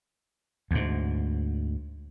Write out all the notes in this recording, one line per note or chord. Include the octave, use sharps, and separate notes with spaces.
D2 G#2